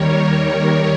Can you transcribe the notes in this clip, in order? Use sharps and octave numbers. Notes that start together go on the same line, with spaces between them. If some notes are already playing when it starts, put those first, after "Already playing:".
Already playing: D#2 D#3 G3 A#4 C#5